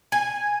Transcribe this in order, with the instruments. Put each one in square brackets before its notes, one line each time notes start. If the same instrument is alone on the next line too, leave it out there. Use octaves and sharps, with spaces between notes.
[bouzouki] G#5